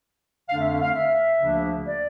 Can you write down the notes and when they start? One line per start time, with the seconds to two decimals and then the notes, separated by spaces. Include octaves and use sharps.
0.48 F2 D3 A3 D4 F5
0.60 E5
0.71 F5
0.82 F5
0.93 E5
1.39 D2 C#3 F3 A#3 D4
1.85 D5